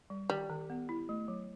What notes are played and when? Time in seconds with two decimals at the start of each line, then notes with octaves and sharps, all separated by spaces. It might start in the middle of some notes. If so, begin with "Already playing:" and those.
0.10 G3
0.30 D#3 G3
0.50 D#3
0.70 B3
0.89 E4
1.09 A3
1.28 F#3